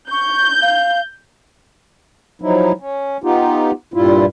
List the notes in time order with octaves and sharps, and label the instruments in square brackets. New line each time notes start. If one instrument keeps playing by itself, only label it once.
[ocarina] C#6 [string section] G6
[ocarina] F5
[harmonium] F3 F#3 D#4 E4
C#4
B3 D#4 F4 G4
G2 A#2 G3 E4 F4